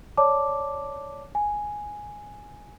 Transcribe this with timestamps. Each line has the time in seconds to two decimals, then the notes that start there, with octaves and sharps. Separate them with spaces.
0.17 C#5 D5 A5 D6
1.35 G#5